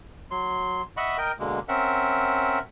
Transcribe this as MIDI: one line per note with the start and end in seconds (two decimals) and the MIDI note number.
0.31 0.82 54
0.31 0.82 84
0.97 1.17 75
0.97 1.17 76
0.97 1.17 78
0.97 1.17 83
0.97 1.17 85
1.18 1.32 70
1.18 1.32 75
1.18 1.32 79
1.39 1.60 47
1.39 1.60 50
1.39 1.60 56
1.39 1.60 58
1.68 2.59 60
1.68 2.59 61
1.68 2.59 70
1.68 2.59 76
1.68 2.59 78